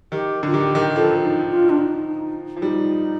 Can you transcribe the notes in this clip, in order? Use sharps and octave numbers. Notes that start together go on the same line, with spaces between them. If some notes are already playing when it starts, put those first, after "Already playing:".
D#3 G4
D3 F4
D#3 G4
D#3
F3 A4
D#4
F4
D4
D#4
F3
G3 D#4